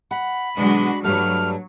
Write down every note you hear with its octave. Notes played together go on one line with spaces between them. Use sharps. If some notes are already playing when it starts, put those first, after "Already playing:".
F#5 B5
B2 D3 F#3 G#3 D4 F#4
G2 F#3 G3 A3 F6